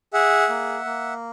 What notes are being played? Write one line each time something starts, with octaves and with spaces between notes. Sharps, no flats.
G#4 E5 F#5
A#3
A#3